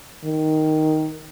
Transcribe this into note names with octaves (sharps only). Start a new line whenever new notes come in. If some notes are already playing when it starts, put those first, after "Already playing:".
D#3